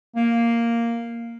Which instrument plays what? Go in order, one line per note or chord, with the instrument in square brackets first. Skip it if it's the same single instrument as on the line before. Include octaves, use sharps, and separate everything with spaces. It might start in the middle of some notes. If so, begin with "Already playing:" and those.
[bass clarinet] A#3